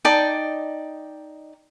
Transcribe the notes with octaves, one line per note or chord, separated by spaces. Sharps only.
D#4 D5 G5 A5